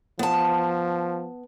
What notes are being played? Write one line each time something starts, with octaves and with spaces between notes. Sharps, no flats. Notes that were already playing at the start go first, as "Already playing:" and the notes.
F3 B3 A5